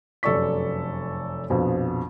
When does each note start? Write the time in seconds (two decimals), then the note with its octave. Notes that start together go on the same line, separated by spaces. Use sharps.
0.23 F1 F#2 A4 D5 C#6 B6
1.50 A#1 F2 B2